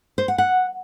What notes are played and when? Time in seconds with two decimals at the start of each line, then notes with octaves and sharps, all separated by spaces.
0.18 C5
0.28 F#5
0.38 F#5